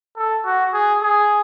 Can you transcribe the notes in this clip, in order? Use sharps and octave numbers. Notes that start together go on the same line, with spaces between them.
A4
F#4
G#4
G#4